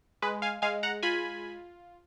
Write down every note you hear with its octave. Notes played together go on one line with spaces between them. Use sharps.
G#3 B4
F5 G#5
G#3 F5 G#5
F#5 A#5
F4 G#5 B5